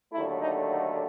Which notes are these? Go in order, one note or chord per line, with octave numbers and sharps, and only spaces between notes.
D#2 D3 F#3 A3 E4
D#4
D#4